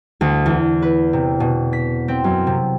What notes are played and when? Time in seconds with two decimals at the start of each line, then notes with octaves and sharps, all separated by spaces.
0.21 D2
0.46 E2
0.82 B4
1.13 C3
1.40 B2
1.73 B6
2.08 C4
2.24 F#2
2.47 C3